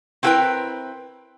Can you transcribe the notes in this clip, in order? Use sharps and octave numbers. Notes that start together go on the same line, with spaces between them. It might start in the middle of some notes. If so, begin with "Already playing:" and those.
C4 E4 F#4 A#4 B4 G5